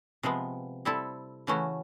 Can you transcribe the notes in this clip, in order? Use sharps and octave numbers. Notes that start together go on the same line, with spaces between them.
C3 F3 G#3 B3
G3 C4 E4 A4
C#3 E3 A3 C#4 F#4